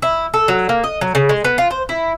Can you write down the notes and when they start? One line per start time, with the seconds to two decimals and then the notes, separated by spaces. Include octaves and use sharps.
0.02 E4
0.34 A4
0.48 F#3
0.69 A#3
0.84 D#5
1.01 F#3
1.15 C#3
1.29 G#3
1.45 B3
1.58 F4
1.71 C5
1.89 E4